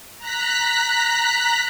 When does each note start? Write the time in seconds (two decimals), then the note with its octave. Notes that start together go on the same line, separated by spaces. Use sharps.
0.19 A#5 F#6 B6